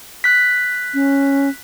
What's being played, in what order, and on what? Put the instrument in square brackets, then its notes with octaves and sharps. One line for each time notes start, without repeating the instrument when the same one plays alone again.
[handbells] F#6 B6
[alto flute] C#4